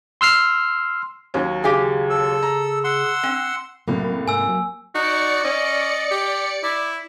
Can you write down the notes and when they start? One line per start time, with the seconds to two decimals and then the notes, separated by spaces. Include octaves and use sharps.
0.21 C6 E6 F6 C7
1.34 D#2 F#3 C#4
1.64 C#3 G4 G#4 F5 G#5
2.10 A4 E6
2.43 A#5
2.84 F#5 C6 E6
3.23 C4
3.88 C2 F#2 A2 F#3 A#3
4.28 G#2 G#5 E6
4.48 F#3
4.95 D#4 F#4 D5 C#7
5.44 C#4 D#5
6.11 G4
6.63 E4 D5